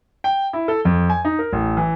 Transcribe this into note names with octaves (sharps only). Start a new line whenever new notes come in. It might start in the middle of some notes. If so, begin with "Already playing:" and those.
G5
E4
A4
F2
G#5
D#4
A#4
A1
E3